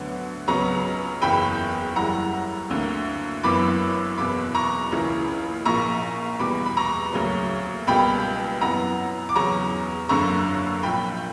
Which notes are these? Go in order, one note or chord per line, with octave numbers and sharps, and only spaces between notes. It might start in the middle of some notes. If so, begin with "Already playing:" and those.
Already playing: D2 D3 F#3 B3 F#5
C#2 C#3 F#3 B3 A#5 C#6
F#1 E2 C#3 G5 B5
F#1 F#2 E3 G3 F#5 A#5
D2 D3 A#3
F#1 F#2 E3 B3 B5 D6
F#1 E2 B2 B5 D6
A#5 C#6
C#2 C#3 E3 A#3
A#1 A#2 A#3 A#5 C#6
E2 B2 G3 B5 D6
B5
A#5 C#6
D2 C#3 F#3 A#3
C#2 B2 G3 A#3 G5 B5
F#2 E3 B3 F#5 A#5
D6
E2 C#3 F#3 A#5 C#6
F#1 F#2 D3 A#3 A#5 C#6
A#1 A#2 A#3 G5 B5